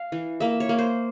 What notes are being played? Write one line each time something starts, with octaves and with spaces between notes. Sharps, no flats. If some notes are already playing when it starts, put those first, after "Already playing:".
Already playing: F5
E3
A#3 E5
C#5
A#3
C5